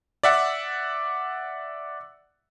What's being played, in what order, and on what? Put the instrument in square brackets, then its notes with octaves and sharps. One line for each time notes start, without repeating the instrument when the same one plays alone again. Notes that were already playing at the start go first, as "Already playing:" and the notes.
[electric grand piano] D5 E5 F#5